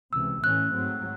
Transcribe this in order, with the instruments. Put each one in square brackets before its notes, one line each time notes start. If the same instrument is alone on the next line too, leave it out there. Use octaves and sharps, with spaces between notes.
[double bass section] C#2 C3 E3 [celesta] E6
[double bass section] A2 E3 A3 C#4 [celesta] F#6
[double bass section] G#2 F#3 C4